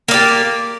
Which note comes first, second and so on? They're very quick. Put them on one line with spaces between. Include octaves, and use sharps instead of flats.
A#3 D5 G4